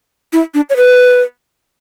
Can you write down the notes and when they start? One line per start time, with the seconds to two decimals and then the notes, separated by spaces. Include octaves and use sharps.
0.33 E4
0.54 D4
0.70 C#5
0.77 B4